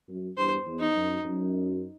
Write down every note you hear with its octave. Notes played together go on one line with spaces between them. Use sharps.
F#2
E2 G2 C5
E2
D#4
F#2
F#2